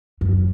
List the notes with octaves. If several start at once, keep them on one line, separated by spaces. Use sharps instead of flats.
F#2